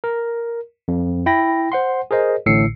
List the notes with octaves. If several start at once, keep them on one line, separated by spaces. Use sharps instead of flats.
A#4
F2
E4 G5 B5 A#6
C5 F#5 C6
G#4 A#4 C5 D#5
A1 A2 D3 E6 C7 C#7